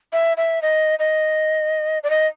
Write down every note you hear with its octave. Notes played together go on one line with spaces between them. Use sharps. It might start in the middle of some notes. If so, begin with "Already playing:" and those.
E5
E5
D#5
D#5
D5
D#5